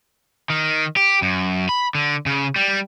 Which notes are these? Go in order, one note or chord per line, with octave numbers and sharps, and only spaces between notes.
D#3
G4
F#2
B5
D3
C#3
G3